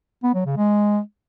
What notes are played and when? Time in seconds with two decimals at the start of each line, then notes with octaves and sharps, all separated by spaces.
0.23 B3
0.34 F#3
0.46 C#3
0.57 G#3